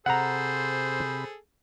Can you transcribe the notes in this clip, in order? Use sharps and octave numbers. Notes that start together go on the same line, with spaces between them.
C3 G#4 A4 C5 F#5 A#5 B5